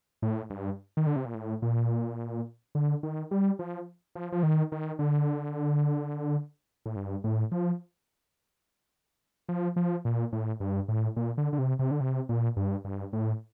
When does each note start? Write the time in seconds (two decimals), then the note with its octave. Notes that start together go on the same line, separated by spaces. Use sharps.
0.22 A2
0.50 G2
0.97 D#3
1.07 D3
1.16 C3
1.25 A#2
1.34 A2
1.62 A#2
2.75 D3
3.03 D#3
3.31 G3
3.59 F3
4.15 F3
4.32 F3
4.43 D#3
4.72 D#3
4.99 D3
6.86 A2
6.96 G2
7.24 A2
7.52 F3
9.49 F3
9.76 F3
10.05 A#2
10.33 A2
10.60 G2
10.88 A2
11.16 A#2
11.38 D3
11.53 D3
11.59 C3
11.79 C3
11.91 D3
12.01 C3
12.29 A#2
12.57 G2
12.85 G2
13.13 A2